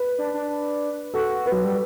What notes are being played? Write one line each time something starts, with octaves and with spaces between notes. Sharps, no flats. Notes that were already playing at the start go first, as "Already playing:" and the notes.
Already playing: B4
D4
D4
F#4 A4
B4
F#3
G3